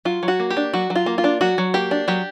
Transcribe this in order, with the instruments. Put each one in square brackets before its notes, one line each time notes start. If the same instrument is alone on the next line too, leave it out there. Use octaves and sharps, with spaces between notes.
[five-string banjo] F#3 F4
F#3
F#4
A#3
G4
D4
F#3 F#4
F#3
F4
A#3
F4
D4
F#3 F#4
F#3
A#3 G4
D4
F#3 G4